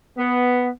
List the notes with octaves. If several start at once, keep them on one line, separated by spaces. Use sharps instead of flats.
B3